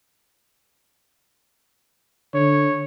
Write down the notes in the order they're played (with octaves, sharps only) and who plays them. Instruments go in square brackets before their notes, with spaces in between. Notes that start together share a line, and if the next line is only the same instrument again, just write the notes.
[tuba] D3 [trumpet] C#5